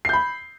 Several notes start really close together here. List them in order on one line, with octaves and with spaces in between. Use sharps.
C7 G6 B5